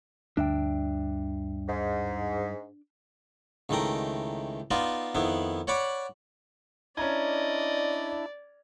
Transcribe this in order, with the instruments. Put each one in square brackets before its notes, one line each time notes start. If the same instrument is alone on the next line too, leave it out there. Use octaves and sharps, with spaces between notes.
[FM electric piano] D2 [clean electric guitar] G2 E5 G5 [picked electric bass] D4
[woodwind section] G#2
[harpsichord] C#2 D#3 E3 A3 G5 A#5
B3 D#4 F4 D5 D#5
F2 D#3 B3 E4
C#5 D5 F#5 B5 C#6 D6
[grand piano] C#4 A#5 G#6 [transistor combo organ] D4 E4 [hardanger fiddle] D5 [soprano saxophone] D#5